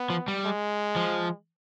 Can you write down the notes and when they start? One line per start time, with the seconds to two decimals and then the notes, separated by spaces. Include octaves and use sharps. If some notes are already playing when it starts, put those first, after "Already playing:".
Already playing: B3
0.10 F3
0.28 G3
0.45 G#3
0.96 F3